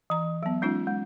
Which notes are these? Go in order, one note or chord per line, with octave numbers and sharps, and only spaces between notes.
E3 A#5
F#3 B3
G#3 C#4 D#4 F4
G#3